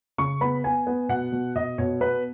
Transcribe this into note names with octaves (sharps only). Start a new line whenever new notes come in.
C#3 C#6
B3 B5
B3 G#5
B3
B2 F#5
B2
B2 D#5
B2 C#5
B3 B4